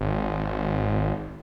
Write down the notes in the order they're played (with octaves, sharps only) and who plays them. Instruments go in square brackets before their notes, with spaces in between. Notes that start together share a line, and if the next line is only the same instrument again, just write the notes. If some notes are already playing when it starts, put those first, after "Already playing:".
[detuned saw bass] G#1